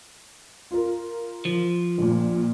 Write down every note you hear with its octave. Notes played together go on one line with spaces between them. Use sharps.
F4 A#4
F3
A#1 A#2